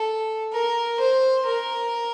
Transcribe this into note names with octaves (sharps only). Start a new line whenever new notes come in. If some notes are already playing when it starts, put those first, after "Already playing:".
Already playing: A4
A#4
C5
A#4